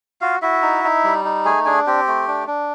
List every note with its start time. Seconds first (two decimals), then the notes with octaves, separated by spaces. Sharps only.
0.21 F4 F#4 F5
0.42 E4 F#4 E5
0.62 D#4
0.84 D#4
1.04 G3
1.25 D#4
1.45 A3 G#4 G#5
1.65 D4 G#4 G#5
1.87 C4 G4 G5
2.07 A3
2.28 D4
2.47 D4